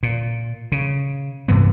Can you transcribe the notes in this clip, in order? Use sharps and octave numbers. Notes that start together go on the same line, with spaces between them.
A#2
C#3
G2 C3 E3 B3